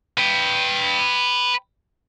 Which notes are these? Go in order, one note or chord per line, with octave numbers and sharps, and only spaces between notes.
B4 G5